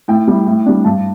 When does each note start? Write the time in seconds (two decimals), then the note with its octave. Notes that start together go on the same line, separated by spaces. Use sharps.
0.08 A2 G5
0.27 G3 E4
0.47 A2
0.66 G3 D4
0.85 G2 A5